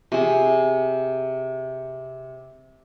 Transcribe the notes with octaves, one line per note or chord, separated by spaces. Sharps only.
C3 G#4